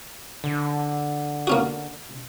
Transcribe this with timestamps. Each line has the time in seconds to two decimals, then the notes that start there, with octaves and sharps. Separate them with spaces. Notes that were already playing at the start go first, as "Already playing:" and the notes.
0.44 D3
1.47 A#3 C#4 F#4